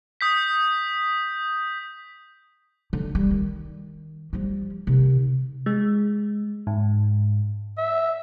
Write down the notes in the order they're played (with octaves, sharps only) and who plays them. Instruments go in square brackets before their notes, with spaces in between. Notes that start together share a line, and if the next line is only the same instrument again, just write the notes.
[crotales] D#6 G6 B6
[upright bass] D3
G3
D#3
F3 G3
C3 D#3
[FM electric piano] G#3
G#2
[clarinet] E5